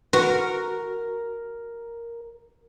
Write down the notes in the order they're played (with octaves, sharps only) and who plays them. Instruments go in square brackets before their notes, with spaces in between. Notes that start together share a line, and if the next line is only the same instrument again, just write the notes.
[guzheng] F#4 [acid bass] A#4 [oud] B4